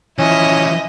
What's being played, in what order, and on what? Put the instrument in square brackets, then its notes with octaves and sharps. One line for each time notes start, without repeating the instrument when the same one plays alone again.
[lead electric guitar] E3 F3 [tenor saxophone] C#4 [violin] E4 D#5